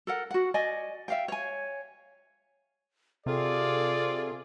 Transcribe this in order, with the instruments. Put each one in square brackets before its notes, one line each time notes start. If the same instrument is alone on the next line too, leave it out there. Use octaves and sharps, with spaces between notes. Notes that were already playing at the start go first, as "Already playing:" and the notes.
[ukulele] A4 A#4 F#5
F#4 F#5
D5 D#5 G#5
E5 F5 G5
C#5 G#5
[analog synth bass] C3 [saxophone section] F4 G#4 [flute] A4 [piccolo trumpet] D5